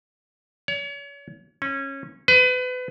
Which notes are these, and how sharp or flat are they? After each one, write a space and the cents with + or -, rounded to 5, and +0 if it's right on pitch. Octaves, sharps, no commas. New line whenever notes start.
C#5 +35
C#4 -20
B4 +30